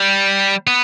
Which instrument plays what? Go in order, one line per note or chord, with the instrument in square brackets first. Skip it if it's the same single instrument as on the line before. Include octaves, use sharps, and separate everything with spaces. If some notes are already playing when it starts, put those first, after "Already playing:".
Already playing: [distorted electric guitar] G3
B3